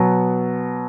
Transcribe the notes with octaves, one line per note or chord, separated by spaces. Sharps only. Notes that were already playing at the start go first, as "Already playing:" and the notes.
Already playing: B2 F#3 B3